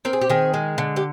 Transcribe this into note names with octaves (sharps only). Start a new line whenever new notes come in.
C4 A#4
G#4
G4
D#3 G#4
G#3
D3
G4